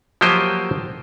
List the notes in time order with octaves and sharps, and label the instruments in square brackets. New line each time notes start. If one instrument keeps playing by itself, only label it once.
[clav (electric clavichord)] F3 F#3 A#3 G4 C5 D#5